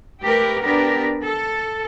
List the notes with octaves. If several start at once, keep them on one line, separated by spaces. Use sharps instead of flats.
A3 G4 A#4 B4
B3 D4 G4 A#4 B4 D5
A4